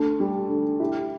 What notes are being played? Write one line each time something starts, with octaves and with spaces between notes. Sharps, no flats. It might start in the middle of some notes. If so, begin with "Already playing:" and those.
Already playing: D2 A4
G3
D3
E4 G4